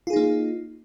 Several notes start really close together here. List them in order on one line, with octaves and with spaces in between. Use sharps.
F4 G#4 D#4 A#3